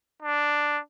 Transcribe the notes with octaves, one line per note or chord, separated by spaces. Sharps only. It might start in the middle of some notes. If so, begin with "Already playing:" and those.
D4